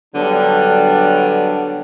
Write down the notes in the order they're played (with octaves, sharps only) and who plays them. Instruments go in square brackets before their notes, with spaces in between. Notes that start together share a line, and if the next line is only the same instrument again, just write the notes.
[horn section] D3 F#3 G3 B3 D4